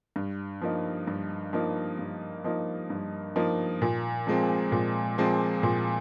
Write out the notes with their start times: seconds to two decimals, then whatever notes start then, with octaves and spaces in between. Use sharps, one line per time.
0.16 G2
0.61 F3 A#3 D#4
1.07 G2
1.53 F3 A#3 D#4
1.99 G2
2.44 F3 A#3 D#4
2.90 G2
3.36 F3 A#3 D#4
3.82 A#2
4.27 F3 G#3 C4
4.72 A#2
5.18 F3 G#3 C4
5.63 A#2